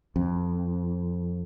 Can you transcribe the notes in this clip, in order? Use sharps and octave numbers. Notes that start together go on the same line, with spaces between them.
F2